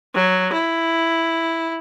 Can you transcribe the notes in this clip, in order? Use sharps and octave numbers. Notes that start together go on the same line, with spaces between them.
F#3
E4